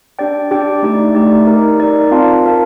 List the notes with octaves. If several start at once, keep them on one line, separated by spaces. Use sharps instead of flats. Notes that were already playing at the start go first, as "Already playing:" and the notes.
D4 G4 D5 G5
D4 G4 D5 G5
A3 D#4 G4 D5
A3 D#4 G4 D5
D#4 A#4 D5
D#4 A#4 D5
C4 F4 A#4 F5 A5
C4 F4 A#4 F5 A5